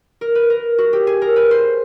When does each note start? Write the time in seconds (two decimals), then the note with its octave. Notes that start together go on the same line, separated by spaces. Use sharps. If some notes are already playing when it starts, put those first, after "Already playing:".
0.21 A#4
0.35 B4
0.50 A#4
0.78 F#4
0.93 G4
1.07 G#4
1.22 A#4
1.36 B4
1.51 C5